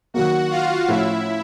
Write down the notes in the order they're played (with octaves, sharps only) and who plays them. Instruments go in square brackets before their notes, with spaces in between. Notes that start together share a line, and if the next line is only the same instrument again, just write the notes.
[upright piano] D#3 F#3 A#3 [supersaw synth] F#4 F#5
[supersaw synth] F4 F5
[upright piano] A2 F3 A3 C#4 F4 [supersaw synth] E4 E5